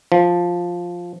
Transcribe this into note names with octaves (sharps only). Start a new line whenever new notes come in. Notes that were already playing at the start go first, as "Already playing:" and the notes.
F3